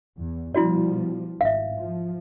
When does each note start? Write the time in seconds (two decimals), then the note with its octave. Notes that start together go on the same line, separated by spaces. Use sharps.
0.18 E2
0.55 B2 F3 G3 E4 F#4 D5
1.41 G#1 E5 F5
1.76 F3